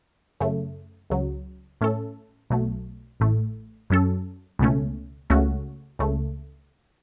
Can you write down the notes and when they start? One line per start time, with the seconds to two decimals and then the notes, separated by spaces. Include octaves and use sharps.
0.40 F#2 C#3 A3
1.10 C#2 C#3 F#3
1.81 A2 A3 C#4 A4
2.50 B1 B2 F#3 A3
3.20 A1 A2 A3
3.90 F#2 F#3 C#4 A4
4.59 C#2 B2 A3 C#4
5.30 C#2 C#3 A3 C#4 F#4
5.99 C#2 C#3 A3